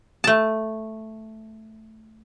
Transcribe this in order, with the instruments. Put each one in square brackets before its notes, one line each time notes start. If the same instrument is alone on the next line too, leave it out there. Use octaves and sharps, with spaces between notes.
[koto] A3 A5